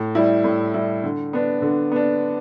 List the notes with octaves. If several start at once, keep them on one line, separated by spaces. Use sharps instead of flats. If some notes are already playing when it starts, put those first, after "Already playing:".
Already playing: A2
G3 E4
A2
G3 E4
D3
B3 D4
D3
B3 D4